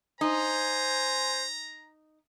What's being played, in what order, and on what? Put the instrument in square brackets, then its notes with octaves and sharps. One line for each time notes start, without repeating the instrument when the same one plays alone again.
[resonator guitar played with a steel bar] D#4 [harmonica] C5 G#5 [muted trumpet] A#5